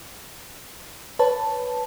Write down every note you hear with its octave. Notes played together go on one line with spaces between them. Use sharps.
B4 C#5 A5